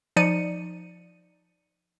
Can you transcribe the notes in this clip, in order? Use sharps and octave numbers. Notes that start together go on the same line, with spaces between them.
F3 D#4 D5 C#7 D#7